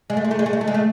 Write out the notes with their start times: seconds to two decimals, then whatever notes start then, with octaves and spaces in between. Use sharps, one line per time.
0.10 G#3
0.17 A3
0.24 G#3
0.31 A3
0.39 G#3
0.46 A3
0.53 G#3
0.61 A3
0.67 G#3
0.74 A3